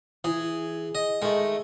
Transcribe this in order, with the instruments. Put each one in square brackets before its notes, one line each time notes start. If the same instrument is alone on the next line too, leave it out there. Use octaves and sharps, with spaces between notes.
[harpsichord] E3 [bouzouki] G#4
[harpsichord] D#5
[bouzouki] D#3 A3 [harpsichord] G#3